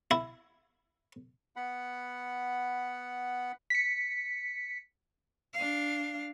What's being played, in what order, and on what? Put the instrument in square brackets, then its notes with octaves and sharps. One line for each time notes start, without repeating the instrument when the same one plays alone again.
[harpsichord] E4
[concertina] B3 F#5 B5
[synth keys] B6 C#7
[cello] D4 F5